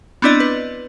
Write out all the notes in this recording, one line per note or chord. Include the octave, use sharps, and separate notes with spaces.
B3 C4 D4 E4 D5 D#5
B4